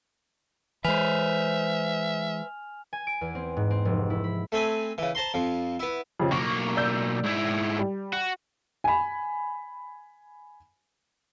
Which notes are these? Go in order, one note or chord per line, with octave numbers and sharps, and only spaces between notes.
E3 G#3 B4 C5 E5 G#5 F6 F7
G#5
D7
E2
C4
G#2
C4
F1
E4
B5
A3 C4 G#5 B5
C#3 E3
C5 A5 A#5 C6
F2 F3
B3 E4
F2 C#3 F3
B1 A#3 C#6
D5 E6 G6
G#2 E4
G3
F#4
G#5 B5